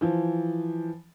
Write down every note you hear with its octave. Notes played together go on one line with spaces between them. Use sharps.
E3 F3